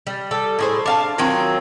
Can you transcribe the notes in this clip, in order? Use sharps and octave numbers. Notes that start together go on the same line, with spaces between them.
G3
G3 A4
A2 G#4 C5
D4 F5 A5
D#3 F#3 C4 F4